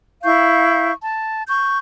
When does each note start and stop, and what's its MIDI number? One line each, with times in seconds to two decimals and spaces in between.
0.23 0.92 64
0.23 0.92 77
0.23 0.92 85
0.23 0.92 91
1.03 1.42 81
1.49 1.78 85
1.49 1.78 91